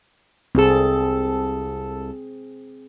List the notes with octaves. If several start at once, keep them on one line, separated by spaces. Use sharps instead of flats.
C2 C4 G#4 A4